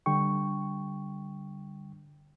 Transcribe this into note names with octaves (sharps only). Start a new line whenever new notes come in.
D3 G3 G5 C#6